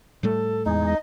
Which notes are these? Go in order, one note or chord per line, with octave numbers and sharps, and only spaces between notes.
A2 G3 A3 A4
E2 G#3 D#4
D#5